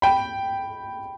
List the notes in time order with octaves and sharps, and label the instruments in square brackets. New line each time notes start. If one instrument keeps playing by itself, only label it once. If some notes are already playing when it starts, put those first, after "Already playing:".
[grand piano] G5 B5